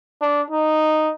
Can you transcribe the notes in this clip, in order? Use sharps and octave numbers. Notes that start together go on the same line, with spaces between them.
D4
D#4